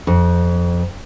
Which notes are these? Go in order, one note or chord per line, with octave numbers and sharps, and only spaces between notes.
F2